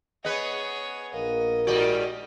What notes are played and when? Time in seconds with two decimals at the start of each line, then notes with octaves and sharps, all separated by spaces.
0.25 B3 G#4 B4 C#5 D#5 B6 C#7
1.14 A#1 A#4 D#5 F5
1.67 G#2 F#4 G4 D5 D#5